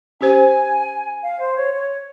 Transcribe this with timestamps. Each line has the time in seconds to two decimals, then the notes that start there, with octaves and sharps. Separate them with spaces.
0.21 C#4 G4 C5 G#5
1.23 F5
1.39 C5
1.56 C#5
1.73 C#5